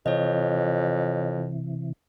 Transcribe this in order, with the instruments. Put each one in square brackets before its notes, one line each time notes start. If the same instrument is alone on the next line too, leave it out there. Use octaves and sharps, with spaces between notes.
[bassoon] F2 [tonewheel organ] C3 E3 [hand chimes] C#5 D#5